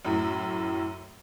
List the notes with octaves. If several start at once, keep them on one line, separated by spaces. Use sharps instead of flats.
F#2 A2